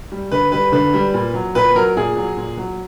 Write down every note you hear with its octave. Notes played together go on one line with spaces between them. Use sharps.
G3
D3 B4
G3 B4
D3 B4
G3
A#2
F#3
A#2 B4
F#3 A#4
A#2 G#4
F#3
A#2
F#3